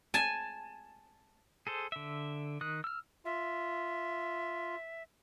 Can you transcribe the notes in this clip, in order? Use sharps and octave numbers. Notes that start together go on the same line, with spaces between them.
G#5 A5
G#4 A4 C5
D3 E5
D#3 D#6 F#6
E6 F6
F4 E5